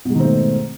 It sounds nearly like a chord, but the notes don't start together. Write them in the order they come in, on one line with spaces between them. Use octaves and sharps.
B2 G#2 D#3 C4 A3